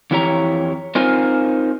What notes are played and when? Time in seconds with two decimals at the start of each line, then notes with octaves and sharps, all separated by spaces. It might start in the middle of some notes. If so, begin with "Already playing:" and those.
0.11 F2 E3 E4 G4 C#5 A#5
0.95 C4 D#4 F4 A#4 C5 G#5